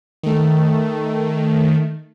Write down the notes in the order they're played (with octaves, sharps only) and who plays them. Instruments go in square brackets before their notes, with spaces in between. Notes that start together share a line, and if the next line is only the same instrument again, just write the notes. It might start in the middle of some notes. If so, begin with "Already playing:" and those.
[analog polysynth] D#3 A3